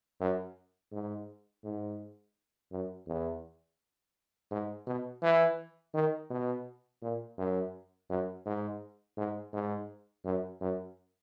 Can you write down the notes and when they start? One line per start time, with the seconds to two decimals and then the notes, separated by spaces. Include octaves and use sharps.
0.20 F#2
0.92 G#2
1.64 G#2
2.72 F#2
3.08 E2
4.51 G#2
4.87 B2
5.23 E3
5.95 D#3
6.30 B2
7.02 A#2
7.38 F#2
8.10 F#2
8.46 G#2
9.18 G#2
9.53 G#2
10.25 F#2
10.61 F#2